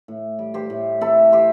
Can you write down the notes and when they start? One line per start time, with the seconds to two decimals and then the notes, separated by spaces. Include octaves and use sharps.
0.08 A2
0.39 G3
0.54 G4 C5
0.70 A2
1.01 C4 E4 A4
1.32 C4 G4 C5